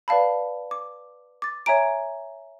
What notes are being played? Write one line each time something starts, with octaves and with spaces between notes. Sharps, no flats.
B4 D5 F5 A5 B5
D6
D6 A6
C#5 E5 G#5 A#5 D7